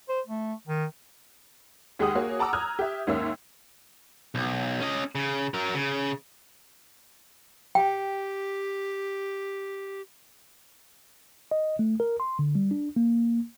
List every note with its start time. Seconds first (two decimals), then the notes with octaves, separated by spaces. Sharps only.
0.09 C5
0.27 A3
0.67 D#3
1.99 D#2 G#3 G4 G#4 F#5 D#6
2.15 A#3 F#4 G#4 C#5
2.39 F#5 A5 A#5 D6 E6
2.53 A#5 D#6 F6 F#6 G#6
2.79 G4 E5
3.07 D#2 G#2 A#3 C#4 E5 E6
4.35 B1
4.80 C#4 D#5
5.15 C#3
5.54 F#3 A#4
5.74 C#3
7.75 G4 G5
11.51 D#5
11.79 A3
12.00 A#4
12.20 C6
12.39 D3
12.55 G3
12.71 D4
12.96 A#3